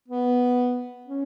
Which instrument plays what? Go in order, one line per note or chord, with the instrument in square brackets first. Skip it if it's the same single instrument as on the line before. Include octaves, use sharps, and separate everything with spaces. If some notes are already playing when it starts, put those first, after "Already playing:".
[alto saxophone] B3
C#4